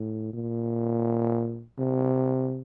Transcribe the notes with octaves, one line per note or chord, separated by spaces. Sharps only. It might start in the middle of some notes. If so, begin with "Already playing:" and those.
Already playing: A2
A#2
C3